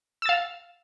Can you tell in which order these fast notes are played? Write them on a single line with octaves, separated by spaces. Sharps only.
E6 A6 F5